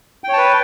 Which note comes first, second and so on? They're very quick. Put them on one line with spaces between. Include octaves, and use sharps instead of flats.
G5 C#5 A5 B4